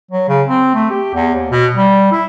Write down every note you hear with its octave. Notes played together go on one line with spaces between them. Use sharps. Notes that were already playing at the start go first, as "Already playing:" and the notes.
F#3
C#3
C4
A3
G4
E2
D#2
B2
G3
E4